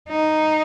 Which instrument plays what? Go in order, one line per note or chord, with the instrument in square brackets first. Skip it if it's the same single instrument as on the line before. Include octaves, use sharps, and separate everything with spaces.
[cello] D#4